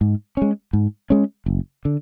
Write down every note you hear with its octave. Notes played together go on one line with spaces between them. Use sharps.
G#2
G#3 C#4
G#2
G#3 C#4
F#1
D3